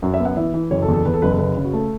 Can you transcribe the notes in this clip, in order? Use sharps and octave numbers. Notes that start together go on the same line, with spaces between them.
F#2 F#4
E5
B3
F#5
E3 E5
E3
F#1 C#5
A4
E2
A4
E2 B4
A4
F#1 B4
A4
C#3 B4
C#3
F#4
A3 A4